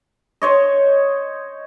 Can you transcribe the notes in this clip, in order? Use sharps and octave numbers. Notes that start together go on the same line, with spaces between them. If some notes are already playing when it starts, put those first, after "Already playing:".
C5 C#5 D#5